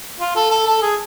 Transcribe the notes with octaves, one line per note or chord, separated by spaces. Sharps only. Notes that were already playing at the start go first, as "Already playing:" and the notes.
F4
A4
A4
A4
G#4